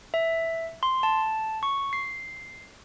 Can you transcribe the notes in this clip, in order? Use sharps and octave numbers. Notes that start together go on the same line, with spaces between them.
E5
C6
A5
C#6
C7